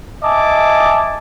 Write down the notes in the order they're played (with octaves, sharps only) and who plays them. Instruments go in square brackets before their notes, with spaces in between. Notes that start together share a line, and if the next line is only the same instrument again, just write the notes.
[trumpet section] D#5 E5 G#5 A5 D6